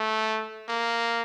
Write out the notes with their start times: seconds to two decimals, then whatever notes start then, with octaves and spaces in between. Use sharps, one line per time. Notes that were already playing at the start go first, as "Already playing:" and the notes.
Already playing: A3
0.69 A#3